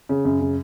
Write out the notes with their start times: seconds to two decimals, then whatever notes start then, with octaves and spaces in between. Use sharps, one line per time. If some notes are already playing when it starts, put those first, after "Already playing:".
0.09 C#3
0.25 F#2
0.41 C#3